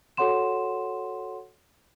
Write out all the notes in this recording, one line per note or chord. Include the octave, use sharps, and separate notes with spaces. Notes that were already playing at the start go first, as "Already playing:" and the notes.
F#4 A4 C#5 F#5 C6 E7